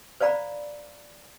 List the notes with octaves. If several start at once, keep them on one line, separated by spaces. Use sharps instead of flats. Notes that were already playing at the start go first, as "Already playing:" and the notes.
C5 D5 F5 A#5 B5